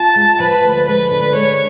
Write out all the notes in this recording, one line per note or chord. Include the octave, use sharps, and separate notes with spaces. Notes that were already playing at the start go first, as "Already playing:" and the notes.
Already playing: F4 A5
G#3
F3 B4
D2
G#3 B4
D3
G#3 C#5